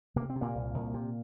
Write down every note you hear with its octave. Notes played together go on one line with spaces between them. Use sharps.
C3 A#3
C4
C3
A#2 A#3
C2
C2
C3